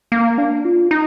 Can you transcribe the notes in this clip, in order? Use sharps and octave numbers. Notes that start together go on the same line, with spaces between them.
A#3
D4
F4
D#4